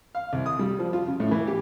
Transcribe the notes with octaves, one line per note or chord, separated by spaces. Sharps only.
F5
C2
D#6
G3
F3
F4
C#3
A2
E3
G4